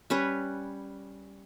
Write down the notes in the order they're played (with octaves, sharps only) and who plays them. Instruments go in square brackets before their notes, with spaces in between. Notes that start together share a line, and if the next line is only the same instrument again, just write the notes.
[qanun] G3 C#4 B4 C#5